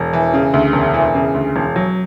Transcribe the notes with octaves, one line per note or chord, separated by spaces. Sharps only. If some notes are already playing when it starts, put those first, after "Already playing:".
Already playing: E1
E3
C#3
D2
E1
E3
C#3
D2
E1
F#3